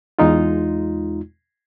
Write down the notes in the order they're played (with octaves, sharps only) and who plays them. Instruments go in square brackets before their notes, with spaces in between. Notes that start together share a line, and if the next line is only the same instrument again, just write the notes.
[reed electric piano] E2 G#3 D#4 F4